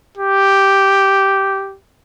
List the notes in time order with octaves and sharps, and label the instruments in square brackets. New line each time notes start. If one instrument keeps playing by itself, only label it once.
[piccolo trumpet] G4